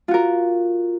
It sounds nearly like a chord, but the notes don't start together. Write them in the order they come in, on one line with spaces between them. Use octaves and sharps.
F4 F#4 A#4